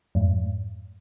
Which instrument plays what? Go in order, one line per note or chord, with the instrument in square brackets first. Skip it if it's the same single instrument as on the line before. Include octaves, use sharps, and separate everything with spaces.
[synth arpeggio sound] F2 G#2